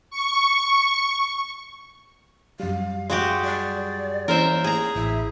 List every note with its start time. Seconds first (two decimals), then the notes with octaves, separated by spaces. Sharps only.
0.11 C#6
2.60 F#2 G3 F5
3.10 G#3 F#4 G4
3.44 D5
4.28 E3 A#3 C#4 A#4 C5 E5
4.64 G#4 A#5
4.95 A1 E4